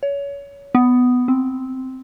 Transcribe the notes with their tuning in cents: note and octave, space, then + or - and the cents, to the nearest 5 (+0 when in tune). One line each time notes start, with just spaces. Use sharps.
C#5 +25
B3 +10
C4 -5